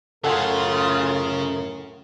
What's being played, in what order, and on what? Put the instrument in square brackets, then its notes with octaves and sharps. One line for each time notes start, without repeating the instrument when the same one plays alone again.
[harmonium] F#2 A2 A#4 [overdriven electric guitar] C#3 [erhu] F4 [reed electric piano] A4 F#5 G#5